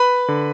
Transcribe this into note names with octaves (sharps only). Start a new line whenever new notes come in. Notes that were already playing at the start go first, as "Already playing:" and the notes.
Already playing: B4 B5
D3